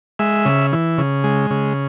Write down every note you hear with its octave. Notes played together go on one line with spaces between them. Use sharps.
G#3 E5
C#3
E3
C#3
G#3
C#3